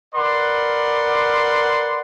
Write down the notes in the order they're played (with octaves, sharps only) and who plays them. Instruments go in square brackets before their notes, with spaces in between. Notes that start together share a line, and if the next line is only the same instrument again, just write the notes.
[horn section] A#4 B4 D5 F#5 C6